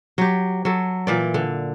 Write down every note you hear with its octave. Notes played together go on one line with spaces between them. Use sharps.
F#3 G4
F#3 A4
A#2 E3 D5
D3